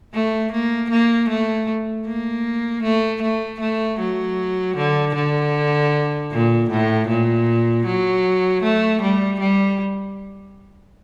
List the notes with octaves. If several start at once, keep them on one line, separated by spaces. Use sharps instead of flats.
A3
A#3
A#3
A3
A#3
A3
A3
A3
F#3
D3
D3
A#2
A2
A#2
F#3
A3
G3
G3